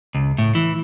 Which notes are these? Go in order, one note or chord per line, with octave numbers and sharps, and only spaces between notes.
C#2
A2
E3